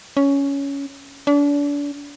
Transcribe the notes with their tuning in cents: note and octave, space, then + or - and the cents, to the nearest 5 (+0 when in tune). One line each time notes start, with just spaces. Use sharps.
C#4 +10
D4 -35